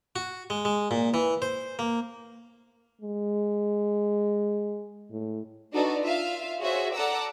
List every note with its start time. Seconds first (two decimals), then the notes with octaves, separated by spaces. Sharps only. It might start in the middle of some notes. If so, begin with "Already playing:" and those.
0.16 F#4
0.50 G#3
0.65 G#3
0.91 A#2
1.14 E3
1.42 C5
1.79 A#3
3.01 G#3
5.11 A2
5.73 D4 D#4 F#4 A4 B4 D5
6.02 F4 E5 F5
6.59 F#4 G#4 C5 C#5 E5
6.93 A4 D5 F#5 A#5 D6 E6